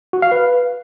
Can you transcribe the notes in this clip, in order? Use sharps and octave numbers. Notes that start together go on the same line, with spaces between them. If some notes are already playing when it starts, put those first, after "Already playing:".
F#4
F5
B4